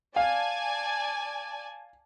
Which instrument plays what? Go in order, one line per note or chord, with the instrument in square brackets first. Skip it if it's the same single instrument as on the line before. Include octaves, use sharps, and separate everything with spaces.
[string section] D5 G#5 A5 [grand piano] F5